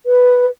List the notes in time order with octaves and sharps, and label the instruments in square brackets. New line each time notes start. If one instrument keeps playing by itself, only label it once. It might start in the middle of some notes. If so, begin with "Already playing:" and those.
[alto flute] B4